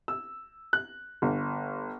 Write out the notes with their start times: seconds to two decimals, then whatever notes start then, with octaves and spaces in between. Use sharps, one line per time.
0.08 E6
0.73 F#6
1.22 G1